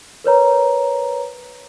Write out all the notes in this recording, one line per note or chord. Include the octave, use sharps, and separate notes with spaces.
A#4 B4 C#5 A#5